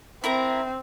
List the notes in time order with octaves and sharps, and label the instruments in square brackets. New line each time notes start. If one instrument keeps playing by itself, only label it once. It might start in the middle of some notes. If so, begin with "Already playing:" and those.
[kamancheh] C4 [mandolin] E4 A#4 A#5